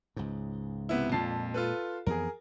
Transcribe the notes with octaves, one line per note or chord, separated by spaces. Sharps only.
C#2 G#2
C3 B3 E4
F2 A#2 G#3 A5 C7
F4 A4 B4
F2 E3 B3 G#4 A#4